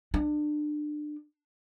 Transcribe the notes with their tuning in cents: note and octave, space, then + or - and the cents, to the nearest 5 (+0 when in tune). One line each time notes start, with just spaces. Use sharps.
D4 +25